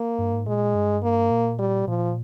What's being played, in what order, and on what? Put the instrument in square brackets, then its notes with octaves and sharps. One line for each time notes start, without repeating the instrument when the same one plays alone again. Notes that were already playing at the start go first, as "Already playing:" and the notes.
Already playing: [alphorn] A#3
[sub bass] G2
G#2
[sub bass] A#2 [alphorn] G#3
[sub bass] G2
[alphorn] A#3
[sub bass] A#2
[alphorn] G3
[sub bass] A#2 [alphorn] F3